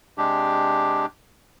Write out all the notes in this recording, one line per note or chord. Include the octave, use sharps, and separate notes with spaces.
C3 G#3 D4 G4